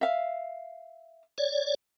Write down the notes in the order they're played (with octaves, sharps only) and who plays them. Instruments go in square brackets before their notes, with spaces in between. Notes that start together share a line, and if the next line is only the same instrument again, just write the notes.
[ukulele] E5 F5
[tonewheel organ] C#5 D5